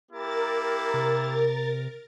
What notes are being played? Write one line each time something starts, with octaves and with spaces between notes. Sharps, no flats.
A#3 E4 G4 A#4 A6
C3